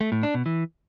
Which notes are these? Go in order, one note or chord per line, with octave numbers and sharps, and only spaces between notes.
A3
A2
D4
B2
E3